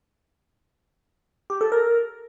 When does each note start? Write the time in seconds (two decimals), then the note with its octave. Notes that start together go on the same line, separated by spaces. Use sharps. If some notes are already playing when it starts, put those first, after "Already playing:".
1.50 G4
1.61 A4
1.72 A#4